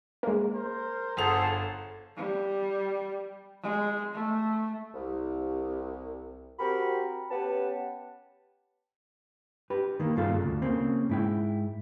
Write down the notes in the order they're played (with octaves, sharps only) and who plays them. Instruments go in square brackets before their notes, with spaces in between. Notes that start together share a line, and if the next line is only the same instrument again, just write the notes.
[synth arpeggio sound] G#3 A#3
[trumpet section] A#4 C5
[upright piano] G1 F#5 F7 [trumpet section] G#4 [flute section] A4 C5
[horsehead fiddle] G3
G#3
A3
[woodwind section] C2
C4 F#4 G4 A#4 B5
B3 C#4 G4 B4 F#5 A5
[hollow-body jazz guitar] G4 B4
D#3 A#3
G2 C#3 F4 A4 F5
D2
C#3 A#3 C4
G#2 E4 G5